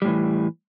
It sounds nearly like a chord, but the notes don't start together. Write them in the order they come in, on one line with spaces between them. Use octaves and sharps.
G3 A2 E3